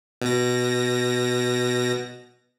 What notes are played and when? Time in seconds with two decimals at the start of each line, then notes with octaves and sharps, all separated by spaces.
0.22 B2 A#6